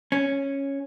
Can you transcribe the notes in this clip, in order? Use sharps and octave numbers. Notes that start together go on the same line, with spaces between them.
C#4